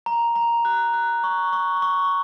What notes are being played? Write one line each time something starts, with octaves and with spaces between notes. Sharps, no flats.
A#5
A#5
F#6
F#6
C#6
C#6
C#6